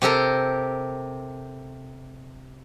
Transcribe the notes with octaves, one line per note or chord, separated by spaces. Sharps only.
C3 G4 A4 A#4